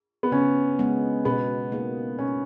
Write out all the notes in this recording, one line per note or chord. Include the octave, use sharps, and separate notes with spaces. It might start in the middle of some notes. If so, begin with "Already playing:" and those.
B3
C#3 C#4
G#3 B3
B2 B3
A#3 D#4 G#4
B2 C#4